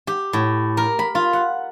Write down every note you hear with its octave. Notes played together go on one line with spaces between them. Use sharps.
G4
A2
A#4
B5
F4
F#5